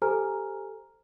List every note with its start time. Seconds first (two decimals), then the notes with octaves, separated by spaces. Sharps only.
0.02 G4 A4 C5 G#5 A#5 F6